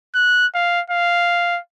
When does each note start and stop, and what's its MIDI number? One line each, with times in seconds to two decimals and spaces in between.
0.15 0.47 90
0.55 0.81 77
0.90 1.59 77